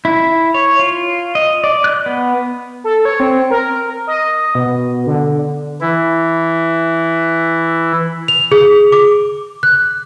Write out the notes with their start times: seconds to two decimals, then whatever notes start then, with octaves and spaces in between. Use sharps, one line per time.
0.05 E4
0.54 C#5
0.79 F4
1.35 D#5
1.64 D5
1.84 F#6
2.06 B3
2.84 A4
3.05 C#5
3.20 C4
3.50 A#4
4.07 D#5
4.55 B2
5.07 D3
5.81 E3 E4
8.28 F7
8.52 G#4
8.92 D6
9.63 F#6